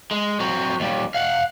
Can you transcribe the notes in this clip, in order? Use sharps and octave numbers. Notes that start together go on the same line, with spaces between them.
G#3
F#3 C4
D#2 G3
F5 F#5